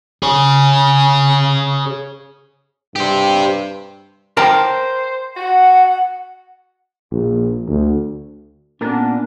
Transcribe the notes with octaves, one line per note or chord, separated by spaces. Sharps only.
G#4 C#5
G2 G4 C5
A#4 C5 G5 A5
F#4 F#5
A#1
D2
A#2 B3 C#4 D4 A#4